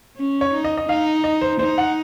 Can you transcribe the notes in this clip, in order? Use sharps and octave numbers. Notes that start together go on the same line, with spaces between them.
C#4
C#5
D#4
D#5
D#5
D#4 F5
D#5
C5
D#4 C5
F#5